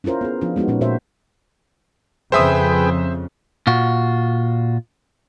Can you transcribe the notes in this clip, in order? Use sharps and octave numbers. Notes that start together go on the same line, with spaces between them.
C#4 E4 F4 A#4 C5
B3 G#4
F3 B3 D4 F4
G#3 B3 D#4 F#4
A#2 G#3 C#4 D#4
A#2 F#4 A#4 C5 E5
F2 C#3 G#4 B4 C5 E5 G5 D#6
A#2 F4 F#4